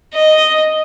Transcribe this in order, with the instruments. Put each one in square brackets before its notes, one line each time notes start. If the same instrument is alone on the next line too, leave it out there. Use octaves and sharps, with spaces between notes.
[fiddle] D#5